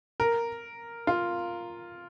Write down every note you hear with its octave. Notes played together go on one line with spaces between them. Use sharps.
A#4
F4